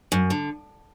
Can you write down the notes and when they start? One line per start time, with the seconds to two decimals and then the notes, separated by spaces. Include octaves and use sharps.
0.12 F#2
0.30 D3